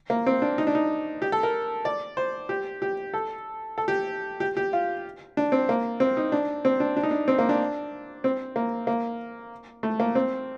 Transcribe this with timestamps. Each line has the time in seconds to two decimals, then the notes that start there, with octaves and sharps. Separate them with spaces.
0.10 A#3
0.27 C4
0.42 D4
0.58 D#4
0.67 D4
0.75 D#4
1.22 G4
1.32 A4
1.43 A#4
1.85 D5
2.17 C5
2.49 G4
2.82 G4
3.14 A4
3.78 A4
3.88 G4
4.40 G4
4.57 G4
4.73 F4
5.37 D4
5.52 C4
5.69 A#3
6.00 C4
6.17 D#4
6.32 D4
6.65 C4
6.80 D4
6.97 D4
7.03 D#4
7.11 D4
7.28 C4
7.39 A#3
7.49 D4
8.24 C4
8.56 A#3
8.87 A#3
9.83 A3
10.00 A#3
10.15 C4